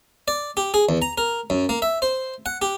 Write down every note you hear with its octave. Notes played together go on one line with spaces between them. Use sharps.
D5
G4
G#4
E2
A#5
A#4
F#2
A#3
E5
C5
F#5
G4